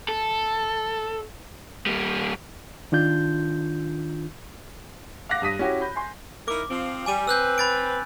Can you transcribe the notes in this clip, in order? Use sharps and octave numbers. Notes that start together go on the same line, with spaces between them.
A4
G3 A#3
D#3 D4 F4 G6
F5 F#5 D6 F#6 A#6
G2 D#6 B6 D#7
C#4 E4 F#4 G4
B5 G6
G#5 C6
D#4 E4 A#4 D6
F3 C4
G3 G#5 D6 D#7
C4 B4 E6 F#6 G6
B5 A6 D7